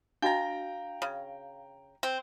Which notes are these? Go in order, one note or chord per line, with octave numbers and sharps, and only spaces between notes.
D4 F#4 D#5 F5 G5 A#5 A#6
C#3
C4